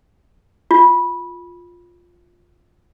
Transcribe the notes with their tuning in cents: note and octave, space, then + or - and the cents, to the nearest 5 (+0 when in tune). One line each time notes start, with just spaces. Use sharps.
F4 +10